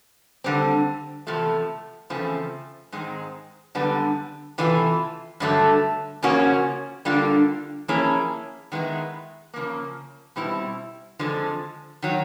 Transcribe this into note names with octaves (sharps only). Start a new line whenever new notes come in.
D3 G3 C4
E2 C3 F3 A3
E2 C#3 F3 A3 C4
G#2 D#3 G#3 C4
F#2 D3 G3 B3 D4
C3 E3 A3 D4 F4
G2 D3 F#3 A3
C#3 F3 A#3 C#4 F#4
D3 G3 A#3 D4 F4
F3 A#3 C#4 E4 G#4
D#3 G#3 B3 E4
C#3 F3 A#3
B2 G3 C4 E4
F2 D3 F3 G#3
D#3 F#3